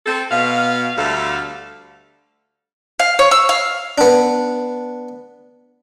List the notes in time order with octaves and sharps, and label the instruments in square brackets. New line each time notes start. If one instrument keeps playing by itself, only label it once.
[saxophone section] C4 A4
B2 F5
D2 D3 G3 A3 A4 F5
[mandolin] F5
C#5
E6
F5
[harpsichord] B3 D4